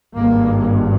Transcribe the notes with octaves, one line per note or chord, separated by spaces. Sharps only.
G#1 G2 A#3